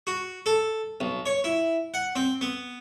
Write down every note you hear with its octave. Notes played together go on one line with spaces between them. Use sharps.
F#4
A4
B1
C#5
E4
F#5
C4
B3